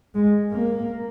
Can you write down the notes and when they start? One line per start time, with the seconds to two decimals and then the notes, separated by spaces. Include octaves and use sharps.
0.15 G#3
0.52 A#3